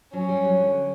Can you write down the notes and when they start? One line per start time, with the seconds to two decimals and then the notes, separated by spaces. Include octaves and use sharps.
0.13 F#3 C#4
0.29 G3
0.45 F#3
0.60 D3